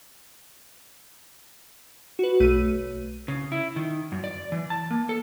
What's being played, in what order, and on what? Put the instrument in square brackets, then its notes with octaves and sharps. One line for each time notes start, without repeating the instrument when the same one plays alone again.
[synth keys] F#4 B4
B1 A3 D#7
[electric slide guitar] C#3
E4
D#3
F#2
D5
E3
A5
A#3
A4